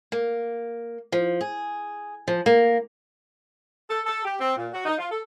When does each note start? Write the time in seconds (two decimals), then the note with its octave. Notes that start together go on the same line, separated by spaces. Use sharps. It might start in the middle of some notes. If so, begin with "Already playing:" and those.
0.12 A#3
1.12 F3
1.41 G#4
2.28 F3
2.46 A#3
3.90 A4
4.06 A4
4.25 G4
4.41 C4
4.57 A#2
4.74 F#4
4.86 D#4
4.99 F4
5.11 A4